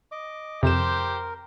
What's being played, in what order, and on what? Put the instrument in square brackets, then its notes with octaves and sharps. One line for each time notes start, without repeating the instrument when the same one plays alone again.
[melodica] D#5 D6
[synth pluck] F2 E7 [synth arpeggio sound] C3 [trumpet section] C4 G4 C5 [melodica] A#4